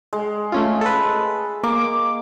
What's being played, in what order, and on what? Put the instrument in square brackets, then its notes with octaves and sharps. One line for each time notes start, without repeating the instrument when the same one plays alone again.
[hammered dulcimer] G#3
[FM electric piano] A3 C#4 F4
A4 B4
[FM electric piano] A#3 [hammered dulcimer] D6